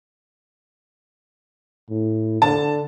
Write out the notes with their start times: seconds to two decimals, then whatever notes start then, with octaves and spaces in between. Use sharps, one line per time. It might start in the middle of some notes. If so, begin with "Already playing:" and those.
1.90 A2
2.42 D3 A5